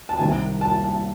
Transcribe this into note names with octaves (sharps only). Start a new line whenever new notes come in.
A5
C2 C3 D#3 G#5
A5
A5